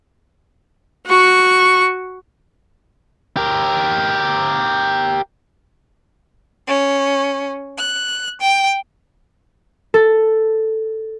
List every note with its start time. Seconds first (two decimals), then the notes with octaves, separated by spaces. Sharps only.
1.07 F#4 C#6
3.37 G4 A#4
6.68 C#4
7.79 F#6
8.41 G5
9.94 A4